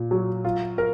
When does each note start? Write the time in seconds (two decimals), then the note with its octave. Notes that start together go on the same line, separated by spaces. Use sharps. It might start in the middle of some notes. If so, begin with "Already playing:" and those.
Already playing: A#2
0.11 F#3
0.45 F4
0.78 A#4